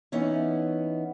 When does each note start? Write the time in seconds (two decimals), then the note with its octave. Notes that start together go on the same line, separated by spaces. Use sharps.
0.12 E3 B3 C#4 D#4